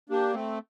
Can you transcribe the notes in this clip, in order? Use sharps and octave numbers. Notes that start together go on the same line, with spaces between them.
A#3 D4 G4
A3 C4